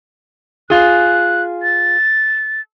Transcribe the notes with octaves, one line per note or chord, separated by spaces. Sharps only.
F4 G#4 F#6
A6